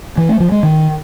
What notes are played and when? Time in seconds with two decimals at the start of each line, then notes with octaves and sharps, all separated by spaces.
0.18 E3
0.29 A3
0.40 F3
0.52 G#3
0.63 D#3